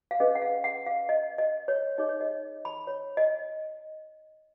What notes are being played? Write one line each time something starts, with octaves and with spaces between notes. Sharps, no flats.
F5
C#4 G#4 B4 D#5
F#5
F5
F#5
F5
D#5
D#5
C#5
D#4 G#4 C#5 D#5
C#5
D#5
B5
C#5
D#5